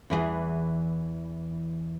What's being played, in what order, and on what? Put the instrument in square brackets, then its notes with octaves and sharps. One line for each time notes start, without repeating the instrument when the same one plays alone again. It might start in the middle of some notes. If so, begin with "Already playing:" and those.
[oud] E2 E3 G#4